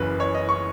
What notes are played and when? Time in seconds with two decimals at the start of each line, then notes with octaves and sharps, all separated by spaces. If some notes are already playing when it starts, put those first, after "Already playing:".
Already playing: F#1 F#2 C#3 E3 B4
0.20 C#5
0.34 D#5
0.49 C#6